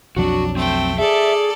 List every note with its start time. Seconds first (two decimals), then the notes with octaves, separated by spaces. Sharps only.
0.16 B1 F2 F#3 D4 F#4
0.56 A3 C4 G5
0.99 G#4 A4 D5 E5